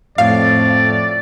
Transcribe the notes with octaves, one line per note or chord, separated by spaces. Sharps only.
F2 A2 D5 F5